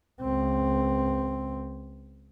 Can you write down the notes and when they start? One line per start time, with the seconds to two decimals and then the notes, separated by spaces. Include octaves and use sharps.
0.21 C#2 C4